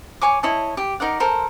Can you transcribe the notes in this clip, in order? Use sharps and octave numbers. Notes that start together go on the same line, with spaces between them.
C#5 G#5 C#6 D6
E4 C#5 D#5 A5
G4
D#4 A#4 D5 F#5
A4 A#4 C5